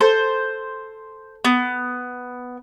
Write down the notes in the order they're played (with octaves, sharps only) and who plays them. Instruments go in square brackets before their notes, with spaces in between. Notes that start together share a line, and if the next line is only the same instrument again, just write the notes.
[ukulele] A4 [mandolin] C5
[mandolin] B3